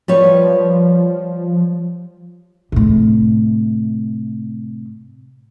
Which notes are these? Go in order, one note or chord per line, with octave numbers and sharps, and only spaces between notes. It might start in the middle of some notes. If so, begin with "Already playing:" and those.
F3 G3 B4 C#5
A2 C3